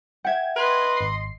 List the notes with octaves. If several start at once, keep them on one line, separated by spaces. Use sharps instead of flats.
E5 F#5 G5 G#6
B4 D#5 C6
G#1 C7